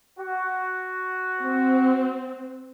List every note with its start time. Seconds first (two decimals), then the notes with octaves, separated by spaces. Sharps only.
0.19 F#4
1.40 C4